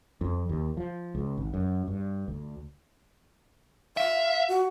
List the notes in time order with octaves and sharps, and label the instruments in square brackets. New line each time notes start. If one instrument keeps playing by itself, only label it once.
[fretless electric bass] F2
D#2
F3
C#2
G#1
F#2
G2
D2
[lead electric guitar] E5 [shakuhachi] F5
[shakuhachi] F#4